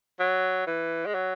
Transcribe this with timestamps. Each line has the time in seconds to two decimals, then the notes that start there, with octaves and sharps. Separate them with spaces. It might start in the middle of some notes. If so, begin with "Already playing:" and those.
0.20 F#3
0.67 E3
1.06 G#3
1.14 F#3